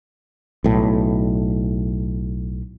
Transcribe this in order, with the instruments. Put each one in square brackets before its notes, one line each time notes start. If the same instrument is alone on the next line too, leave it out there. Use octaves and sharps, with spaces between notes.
[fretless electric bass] B1 A2